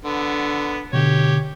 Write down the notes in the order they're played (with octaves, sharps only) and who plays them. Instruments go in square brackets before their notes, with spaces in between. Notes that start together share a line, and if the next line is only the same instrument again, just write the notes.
[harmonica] D3 B3
[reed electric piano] B2 D3 [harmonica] G4 C#5